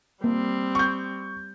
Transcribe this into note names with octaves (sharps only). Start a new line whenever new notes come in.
G3 A#3 C4
C#6 G6